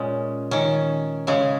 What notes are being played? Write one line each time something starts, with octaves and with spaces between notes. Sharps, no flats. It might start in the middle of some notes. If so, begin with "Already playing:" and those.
Already playing: A#2 G#3 C#4
D#3 C#4
C#3 G#3 C#4